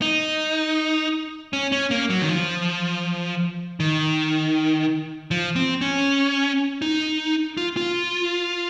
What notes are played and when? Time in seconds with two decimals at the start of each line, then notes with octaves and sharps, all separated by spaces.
0.02 D#4
1.53 C#4
1.72 C#4
1.91 A#3
2.10 F#3
2.21 D#3
2.29 F3
3.80 D#3
5.31 F3
5.56 C4
5.81 C#4
6.82 D#4
7.57 F4
7.77 F4